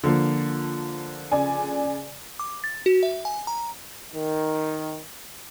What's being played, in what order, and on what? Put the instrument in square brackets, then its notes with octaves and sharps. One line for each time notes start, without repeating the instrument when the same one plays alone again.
[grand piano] D3 F3 A#3
[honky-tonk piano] C#3 D5 G#5
[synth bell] D6
A6
F#4
E5
G#5
A#5
[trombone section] D#3